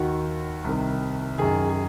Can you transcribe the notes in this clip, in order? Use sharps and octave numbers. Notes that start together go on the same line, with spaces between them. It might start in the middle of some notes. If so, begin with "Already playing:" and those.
Already playing: D#2 D#3 F#4
C2 C3 D#3
F#2 D#3 G#4
G#4